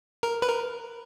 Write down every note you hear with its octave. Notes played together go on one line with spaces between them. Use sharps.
A#4
B4
A#4